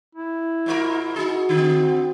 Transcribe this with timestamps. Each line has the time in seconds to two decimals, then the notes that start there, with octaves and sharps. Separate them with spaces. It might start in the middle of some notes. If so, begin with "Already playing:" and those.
0.15 E4
0.66 G#2 F4 A#4
1.16 D#4 F#4 G#4
1.49 D3 C4